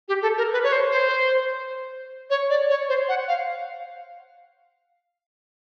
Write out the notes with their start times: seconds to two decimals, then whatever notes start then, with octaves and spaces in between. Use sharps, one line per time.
0.09 G4
0.22 A4
0.38 A#4
0.53 B4
0.64 C#5
0.72 C5
0.91 C5
2.30 C#5
2.50 D5
2.69 C#5
2.89 C5
3.09 F#5
3.28 F5